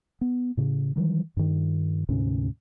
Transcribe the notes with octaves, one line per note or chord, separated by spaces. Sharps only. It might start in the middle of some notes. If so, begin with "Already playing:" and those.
B3
A2 C#3
D#3 E3 F#3 G3
G2 D#3
D2 G#2 C3 C#4